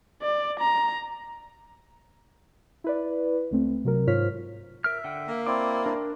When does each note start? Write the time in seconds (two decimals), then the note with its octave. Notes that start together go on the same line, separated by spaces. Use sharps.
0.22 D5
0.60 A#5
2.84 E4 B4 D5
3.51 C#2 A3 C4
3.85 C3 F#3 A#4
4.07 G#2 F4 C5 C#5 F6 B6
4.84 A#4 E5 F6
5.04 D3 F#5 G5
5.28 A#3
5.46 C4 E4 D5 D6
5.86 D4 A#4